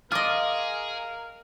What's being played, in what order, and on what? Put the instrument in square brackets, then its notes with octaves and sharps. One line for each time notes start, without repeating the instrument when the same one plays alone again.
[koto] F4 D#5 [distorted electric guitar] G#4 [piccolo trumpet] A#4 [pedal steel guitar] F5 D6